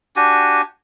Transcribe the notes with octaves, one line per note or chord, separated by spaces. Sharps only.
D4 F#4 G4 G#5